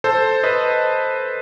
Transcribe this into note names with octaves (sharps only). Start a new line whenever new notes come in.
A4 C5
B4 D#5